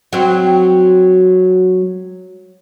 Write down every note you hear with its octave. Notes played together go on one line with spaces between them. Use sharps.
F#3 C4